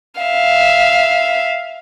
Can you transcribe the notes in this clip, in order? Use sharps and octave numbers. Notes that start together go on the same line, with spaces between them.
E5 F5